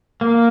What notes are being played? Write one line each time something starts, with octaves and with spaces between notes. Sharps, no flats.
A#3